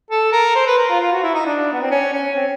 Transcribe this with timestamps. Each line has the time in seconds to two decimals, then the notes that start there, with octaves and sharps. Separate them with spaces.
0.11 A4
0.32 A#4
0.56 C5
0.66 B4
0.78 A#4
0.90 F4
1.01 F4
1.12 F#4
1.23 E4
1.34 D#4
1.46 D4
1.73 B3
1.82 C4
1.91 C#4
2.13 C#4
2.36 C4